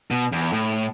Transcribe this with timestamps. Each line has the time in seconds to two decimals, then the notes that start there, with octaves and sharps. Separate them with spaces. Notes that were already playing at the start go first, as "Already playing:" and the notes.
0.11 B2
0.32 E2
0.53 A2